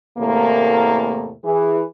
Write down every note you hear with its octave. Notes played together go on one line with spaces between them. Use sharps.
E2 A2 C3 A3 A#3
E3 G#4